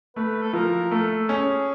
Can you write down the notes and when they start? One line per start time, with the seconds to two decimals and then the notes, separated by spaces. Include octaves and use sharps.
0.16 A3 B4
0.42 A4
0.53 F3 A#4
0.91 A3 A4
1.29 C#4 G#4